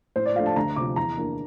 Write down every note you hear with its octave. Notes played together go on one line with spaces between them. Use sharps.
A2 C5
D5
F3 A3 D4 F5
A5
D2 A#5
C3 F3 D6
E2 A#5
E3 A#3 D4